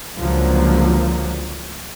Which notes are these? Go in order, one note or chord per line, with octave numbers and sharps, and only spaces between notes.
C#2 D3 F3 F#3 A#3